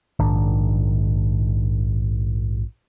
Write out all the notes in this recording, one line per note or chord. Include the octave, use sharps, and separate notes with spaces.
A#1 G#2 D#3 D4